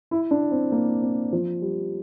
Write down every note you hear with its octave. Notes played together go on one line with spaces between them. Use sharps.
E4
D4
C4
A#3
C4
F3
G3